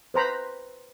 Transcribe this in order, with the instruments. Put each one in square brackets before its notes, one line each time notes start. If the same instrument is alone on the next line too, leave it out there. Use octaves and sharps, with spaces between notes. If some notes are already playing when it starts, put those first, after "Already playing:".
[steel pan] B4 C5 A#5 B5